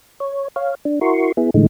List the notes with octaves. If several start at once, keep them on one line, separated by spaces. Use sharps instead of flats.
C#5
C#5 F5
D4
E4 F#4 A#4 C6 C#6
B3 E4 G#4
A2 D3 E3 G#3 A3 D#4